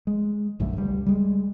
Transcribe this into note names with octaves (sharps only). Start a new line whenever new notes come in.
G#3
A#1 F#2 D3 A3
C#2 G3
G3 G#3